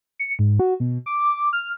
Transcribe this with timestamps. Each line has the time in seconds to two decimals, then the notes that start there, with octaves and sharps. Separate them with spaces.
0.19 C#7
0.39 G#2
0.60 F#4
0.80 B2
1.06 D6
1.53 F6